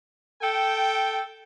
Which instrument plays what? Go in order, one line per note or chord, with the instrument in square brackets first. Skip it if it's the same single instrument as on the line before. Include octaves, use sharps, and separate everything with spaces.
[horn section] A4 G5